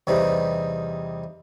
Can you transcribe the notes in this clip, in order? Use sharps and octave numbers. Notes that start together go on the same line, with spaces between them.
E2 C3 G3 D#4